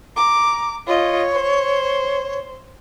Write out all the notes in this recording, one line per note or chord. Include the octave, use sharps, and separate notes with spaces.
A#5 D6
F4 C#5 D#5
C5